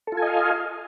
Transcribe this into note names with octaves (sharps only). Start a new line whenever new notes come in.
F4 A4 D#5 F5 G#5